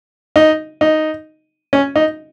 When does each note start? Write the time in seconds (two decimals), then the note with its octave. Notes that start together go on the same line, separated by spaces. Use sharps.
0.36 D#4
0.81 D#4
1.73 C#4
1.96 D#4